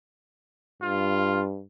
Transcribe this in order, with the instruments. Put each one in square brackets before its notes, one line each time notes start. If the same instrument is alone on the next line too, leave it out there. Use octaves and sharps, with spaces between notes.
[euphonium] G2 [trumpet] F4